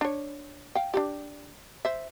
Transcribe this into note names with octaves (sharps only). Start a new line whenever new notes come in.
D4 C#5
F5 G5
D4 F#4 G4
C5 E5